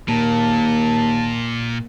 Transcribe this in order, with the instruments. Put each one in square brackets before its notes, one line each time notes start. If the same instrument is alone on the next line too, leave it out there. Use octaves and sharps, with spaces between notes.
[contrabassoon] D#2 [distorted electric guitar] A#2 [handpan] A#3 [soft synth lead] A5